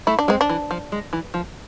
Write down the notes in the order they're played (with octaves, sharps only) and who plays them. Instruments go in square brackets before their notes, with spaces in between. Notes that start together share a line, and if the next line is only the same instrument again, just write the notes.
[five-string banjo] A3 [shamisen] E4
[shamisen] D4
[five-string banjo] G#3 [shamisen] C4
[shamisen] D4
[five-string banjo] E3
F3
G#3
E3
F3